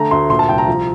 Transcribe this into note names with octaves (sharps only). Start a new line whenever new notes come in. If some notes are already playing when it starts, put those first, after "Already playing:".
Already playing: D3 A3 A#5
D2 C6
A#2 C6
A5
C2 G5
A#5
F3